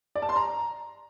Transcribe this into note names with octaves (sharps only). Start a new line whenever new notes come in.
D5
A5
C6
A#5